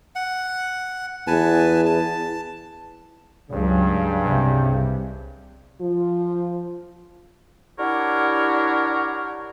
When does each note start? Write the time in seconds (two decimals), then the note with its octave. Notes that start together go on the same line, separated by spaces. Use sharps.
0.16 F#5
1.27 E2 B4 G#5 A5
1.86 A5
3.51 C#2 G2 C#3 F#3
4.25 C2 C3
5.80 F3 F4
7.78 D4 E4 G4 A#4 C#5 F#5